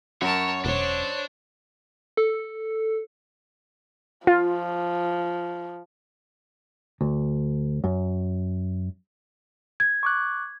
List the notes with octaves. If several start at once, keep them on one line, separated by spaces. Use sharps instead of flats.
F#2 A#4 C#5 A5
E1 D4 C5 C#5
A4
F3 F4
D2
F#2
G#6
C#6 D6 F#6